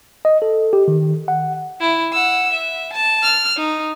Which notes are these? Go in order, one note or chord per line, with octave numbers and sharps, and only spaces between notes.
D#5
A4
G4
D#3
F#5
E4
F#5 E6
E5
A5
F6
D#4